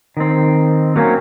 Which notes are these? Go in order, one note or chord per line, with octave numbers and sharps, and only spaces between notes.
D#3 C4
F#3 A#3 C4 C#4